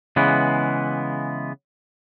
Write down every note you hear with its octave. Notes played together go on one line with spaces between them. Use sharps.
C#3 E3 G#3 B3